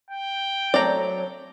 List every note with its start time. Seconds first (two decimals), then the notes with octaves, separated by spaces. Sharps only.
0.10 G5
0.74 F#3 A3 C4 C#5 D5 A#5